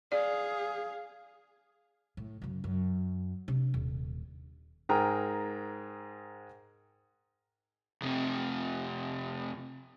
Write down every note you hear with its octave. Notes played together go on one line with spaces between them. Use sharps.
G#4 D5 F5
A2
F#2 C#3
F#2
C3 D4
D#1
G#2 G#4 A#4 G5 A#5
F2 C3